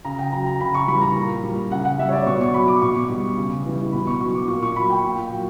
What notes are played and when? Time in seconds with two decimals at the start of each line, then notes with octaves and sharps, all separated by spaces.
0.05 C#3 A#5
0.19 G5
0.32 F#3 A#5
0.46 A#5
0.60 C#3 B5
0.74 C#6
0.88 E3 G3 B5
1.01 A#5
1.16 A#2
1.44 G3
1.71 C#3 F#5
1.85 F#5
1.99 G3 E5
2.09 C#5
2.13 D5
2.26 B2 C#6
2.41 C#6
2.54 F#3 B5
2.68 D6
2.82 B2 C#6
3.10 G3
3.38 C#3
3.66 E3 G3
3.92 B2 B5
4.07 C#6
4.21 F#3 C#6
4.35 D6
4.48 A#2 C#6
4.63 C#6
4.76 F#3 B5
4.90 G5
5.04 A#2
5.32 F#3